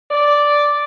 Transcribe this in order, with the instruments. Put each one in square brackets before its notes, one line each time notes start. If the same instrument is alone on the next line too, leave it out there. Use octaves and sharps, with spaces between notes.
[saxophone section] D5